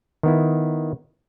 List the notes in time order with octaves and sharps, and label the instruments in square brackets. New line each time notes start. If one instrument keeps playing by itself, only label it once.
[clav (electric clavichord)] D#3 B3 E4